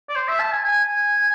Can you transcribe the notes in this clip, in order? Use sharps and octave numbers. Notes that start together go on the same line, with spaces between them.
D5
C5
E5
A5
G#5
G#5